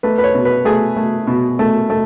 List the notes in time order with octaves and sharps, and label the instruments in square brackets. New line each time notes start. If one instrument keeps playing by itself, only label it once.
[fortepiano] A3 B4
B4
C#5
B2
B4
A3 G#4
A3
B2
A3
A3